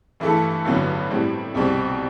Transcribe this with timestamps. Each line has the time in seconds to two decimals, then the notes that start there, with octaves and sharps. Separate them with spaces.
0.20 G2 E3 A3 E4 A4
0.65 A1 G2 D3 F#3 B3
1.10 A2 G3 C4 E4
1.55 C2 B2 G3 C4